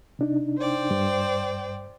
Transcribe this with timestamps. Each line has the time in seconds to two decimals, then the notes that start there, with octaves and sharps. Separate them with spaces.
0.19 C3 D4 D#4
0.57 C5 D5 G5
0.91 G2